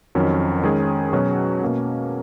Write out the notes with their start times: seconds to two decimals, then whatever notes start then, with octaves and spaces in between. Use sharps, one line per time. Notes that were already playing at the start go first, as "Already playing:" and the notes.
0.15 F2 D#3 F#3 C#4
0.64 D#3 G#3 C#4 G#4
1.13 B2 F#3 C#4 F#4
1.62 B2 A#3 C#4